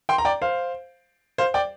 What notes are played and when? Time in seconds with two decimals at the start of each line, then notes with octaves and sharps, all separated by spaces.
0.09 G5 C6
0.18 A#5
0.25 D5 G5
0.42 C5 F5
1.38 C5 F5
1.54 D5 G5